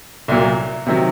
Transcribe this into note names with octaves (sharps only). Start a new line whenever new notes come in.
C2 A#2 F#3 A#3
C3 D#3 F#3